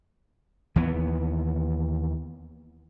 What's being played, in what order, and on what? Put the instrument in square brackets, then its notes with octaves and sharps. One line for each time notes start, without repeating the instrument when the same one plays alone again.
[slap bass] D#2 E3 B3